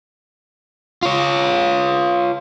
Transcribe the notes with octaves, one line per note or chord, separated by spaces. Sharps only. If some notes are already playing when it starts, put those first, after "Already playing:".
F4 C#5